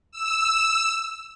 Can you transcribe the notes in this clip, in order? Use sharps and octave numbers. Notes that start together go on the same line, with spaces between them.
E6